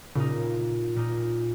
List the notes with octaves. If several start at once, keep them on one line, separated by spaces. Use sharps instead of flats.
A#2 C#3 A#3 D#4
A#2 A#3 D#4